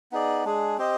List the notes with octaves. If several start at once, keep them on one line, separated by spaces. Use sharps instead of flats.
B3 D#4 G#4 D5
G#3 D4 G#4
C4 G4 C5 D#5